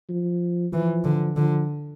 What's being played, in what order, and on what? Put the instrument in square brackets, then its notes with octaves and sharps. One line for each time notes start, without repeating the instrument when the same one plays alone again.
[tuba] F3
[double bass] E3 [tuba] F3
[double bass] D3
[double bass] D3 [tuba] F3